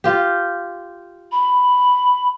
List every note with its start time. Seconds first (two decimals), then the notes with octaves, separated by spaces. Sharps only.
0.04 F4 G4
1.32 B5